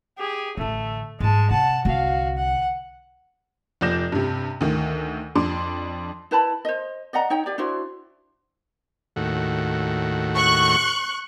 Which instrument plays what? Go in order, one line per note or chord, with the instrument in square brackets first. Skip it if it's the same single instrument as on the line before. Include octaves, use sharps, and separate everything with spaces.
[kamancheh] G4 G#4
[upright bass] A1 D3 [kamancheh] A3
[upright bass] G#2 G3 [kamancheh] G#3 A5
[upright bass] C3 [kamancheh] F#5 A5
[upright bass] C2 D3 [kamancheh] F#4 F5
[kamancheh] F#5
[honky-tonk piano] F1 F3 D5 G6 A#6 E7
G2 C3
D2 D#3
F2 D4 C6
[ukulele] E4 B4 A5 B5
C5 D#5
D5 D#5 F#5 A#5
D#4 C#5 G5
G4 D5
D4 E4 F#4 C5
[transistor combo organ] D#2 A2 F#4
[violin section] C#6 F#6